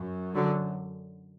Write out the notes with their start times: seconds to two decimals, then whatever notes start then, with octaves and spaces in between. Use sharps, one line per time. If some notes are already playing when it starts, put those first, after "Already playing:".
Already playing: F#2
0.34 D3 F#3